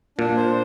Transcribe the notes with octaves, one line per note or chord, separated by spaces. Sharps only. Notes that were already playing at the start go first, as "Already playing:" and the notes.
A#2 D4
C5